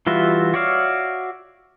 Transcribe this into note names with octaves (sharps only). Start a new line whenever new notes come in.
E3 G3 F4 F#4 E5
F#4 C#5 D5 E5 F5